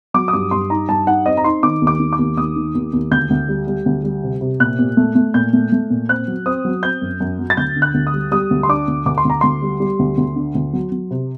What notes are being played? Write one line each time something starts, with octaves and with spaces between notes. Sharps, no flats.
F#3 D6
D#6
G2 D6
G2 C6
D#4 A#5
G2 A5
D#4 F#5
C4 D#5
A#5
D#4 C6
D#3 D6
D#2
D6
D#3
D6
D#2
D#2 D#6
D#3
D#2
D#2
D2 G6
D2
G3
G3
D2
G3
C3
C3
A#2 F#6
A#2
A3
A3
A#2 G6
A3
A3
A#2
C4 F#6
F#3
C4 D#6
F#3
C4 G6
F#2
F#2
F#3
A6
D2 G6
D3
F#6
D2
D#6
G3
G3 D#6
D2
C6
D4 D6
D2
D2 D6
C6
D2
A#5
D2 C6
G3
G3
D2
D2
D3
D2
F#3
F#3
C3